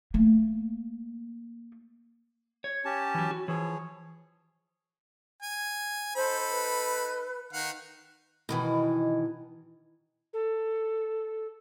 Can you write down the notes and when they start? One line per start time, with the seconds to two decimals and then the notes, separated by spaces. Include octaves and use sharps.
0.14 A3 A#3
2.64 C#5
2.85 C#4 G4 A5
3.14 E3 F#3
3.31 F#4
3.48 E3 F3 G#4 C#5
5.42 G#5
6.15 D#4 A4 C5 B5
6.51 B4
7.53 D#3 F5 F#5
8.49 B2 D#3 E3
10.33 A4